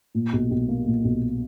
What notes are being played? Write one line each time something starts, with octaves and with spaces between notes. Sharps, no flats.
A#2
B1
B1
A#3
A#2
B1